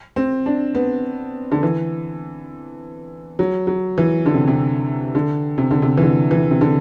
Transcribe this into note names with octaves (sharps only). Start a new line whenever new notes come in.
C4
D4
B3
D3
E3
F#3
F#3
E3
D3
C3
C3
D3
C3
D3
C3
E3
D3
E3
C3
D3